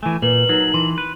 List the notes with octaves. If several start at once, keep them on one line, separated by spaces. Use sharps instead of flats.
E3 A3 G#5
A#2 A#4 B4 F#7
F#3 D#4 A#4
E3 C6
B4